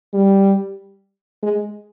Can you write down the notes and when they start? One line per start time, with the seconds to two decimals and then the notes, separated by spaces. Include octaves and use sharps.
0.14 G3
1.43 G#3